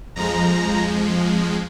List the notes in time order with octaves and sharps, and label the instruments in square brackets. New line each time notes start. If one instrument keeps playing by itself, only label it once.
[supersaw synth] F2 F3 G#3 A#5